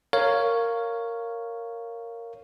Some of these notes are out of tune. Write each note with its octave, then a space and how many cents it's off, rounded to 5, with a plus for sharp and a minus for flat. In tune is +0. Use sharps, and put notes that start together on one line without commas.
A#4 -10 C#5 +0 F5 +0